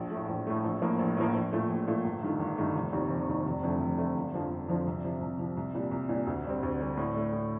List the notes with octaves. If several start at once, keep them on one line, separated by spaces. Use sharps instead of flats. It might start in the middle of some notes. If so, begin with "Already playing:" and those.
Already playing: A#1
A2 A3
A#1
A2 A3
A#1
A2 F3 A#3
A#1
A2 F3 A#3
A#1
A#2 A3
A#1
A#2 A3
G1
G2 D#3 A3
G1
G2 D#3 A3
F1
D#2 D#3 G3 C4
F1
D#2 D#3 G3 C4
F1
F2 D3 A3
F1
F2 D3 A3
G1
F2 D3 F3 C4
G1
F2 D3 F3 C4
C2
C3 F3
C2
C3 F3
C2
A#2 G3 D4
C2
A#2 G3 D4
D2
D3 G3 C4
D2
D3 G3 C4
A2
A3 D4
A2